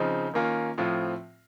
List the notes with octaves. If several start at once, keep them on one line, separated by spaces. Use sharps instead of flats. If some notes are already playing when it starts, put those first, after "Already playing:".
Already playing: C#3 F3 C4 D#4
D#3 A#3 C#4 F4
A2 F3 C4 F4